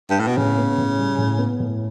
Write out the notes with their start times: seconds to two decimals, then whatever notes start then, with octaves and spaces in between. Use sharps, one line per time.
0.10 G2
0.19 A2
0.27 B2
0.37 A2 C#3
0.57 B3
0.78 A2
0.98 G3
1.18 A2
1.38 B3
1.60 A2